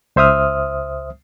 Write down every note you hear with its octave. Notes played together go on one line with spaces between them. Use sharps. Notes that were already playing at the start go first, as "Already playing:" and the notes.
C#2 C5 E5 D#6 F6